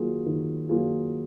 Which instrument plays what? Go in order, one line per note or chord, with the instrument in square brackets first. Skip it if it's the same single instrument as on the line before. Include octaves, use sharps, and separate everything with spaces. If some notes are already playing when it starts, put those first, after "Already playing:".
Already playing: [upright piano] D#3 F#3 A#3 F4 G#4
D#3
F#3 A#3 F4 G#4